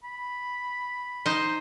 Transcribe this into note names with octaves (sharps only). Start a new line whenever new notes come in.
B5
D#4 C5